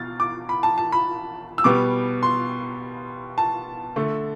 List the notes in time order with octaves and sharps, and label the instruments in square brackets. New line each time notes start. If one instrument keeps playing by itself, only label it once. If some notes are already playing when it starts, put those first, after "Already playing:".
Already playing: [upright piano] B2 F6 A6
D6
B5
A5
A5
B5
E6
B2 G3 B3 D6
C6
A5
D3 A3